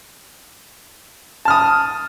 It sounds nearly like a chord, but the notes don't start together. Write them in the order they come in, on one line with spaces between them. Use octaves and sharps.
A5 F6 D#6